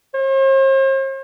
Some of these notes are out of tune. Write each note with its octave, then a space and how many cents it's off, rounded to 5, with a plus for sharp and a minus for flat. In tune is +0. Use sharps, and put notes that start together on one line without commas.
C5 +45